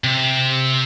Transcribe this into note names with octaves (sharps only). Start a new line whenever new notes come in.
C3